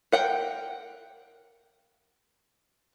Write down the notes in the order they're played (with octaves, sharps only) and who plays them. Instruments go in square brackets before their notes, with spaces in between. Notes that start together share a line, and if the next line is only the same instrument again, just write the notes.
[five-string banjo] A#4 F#5 G5